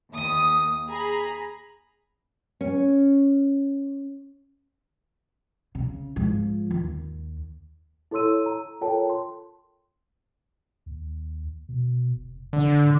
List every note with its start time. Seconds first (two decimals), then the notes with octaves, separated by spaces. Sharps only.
0.12 D#2 D#6
0.89 G#4 A#5 B5
2.61 C#4
5.75 C#3
6.16 G#2 F3
6.71 D#2
8.11 E4 A4 C#5 C6 E6 D#7
8.46 A#5
8.81 F4 A4 A#4 C#5 G5 A5
9.09 C6
10.86 D#2
11.69 B2
12.16 F1
12.53 D3
12.84 G#2